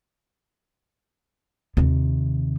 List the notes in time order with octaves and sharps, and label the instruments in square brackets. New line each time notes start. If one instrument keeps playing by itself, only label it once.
[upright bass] D#2 C3